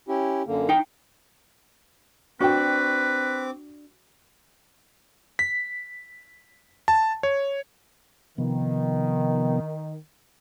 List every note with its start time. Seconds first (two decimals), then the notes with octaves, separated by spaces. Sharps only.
0.08 C#4 E4 G4
0.47 F#2 D3 A#3
0.69 D#4 G5
2.41 C4 D4 F#4 B4 G5 D6
5.39 B6
6.88 A5
7.23 C#5
8.38 C3 D#3 F3 B3